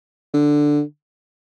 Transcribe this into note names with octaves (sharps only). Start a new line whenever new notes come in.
D3